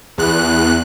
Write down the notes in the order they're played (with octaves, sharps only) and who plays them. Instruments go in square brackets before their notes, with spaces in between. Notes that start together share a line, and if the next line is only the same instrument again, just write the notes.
[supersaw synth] E2 F#6